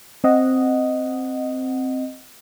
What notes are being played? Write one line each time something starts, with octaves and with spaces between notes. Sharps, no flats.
C4 D#5 F#5